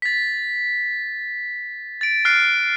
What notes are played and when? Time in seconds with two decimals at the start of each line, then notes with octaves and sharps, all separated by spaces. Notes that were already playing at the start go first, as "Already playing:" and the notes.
0.02 A6 B6
2.01 A6 D7
2.25 F6 F#6 C7 D7